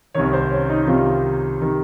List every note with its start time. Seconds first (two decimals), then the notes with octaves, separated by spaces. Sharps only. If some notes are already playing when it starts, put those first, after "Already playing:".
0.15 C2 C3 D#3 C#5
0.33 C5
0.51 C#4
0.70 D#4
0.87 C2 C3 D#3 F4
1.61 C3 D#3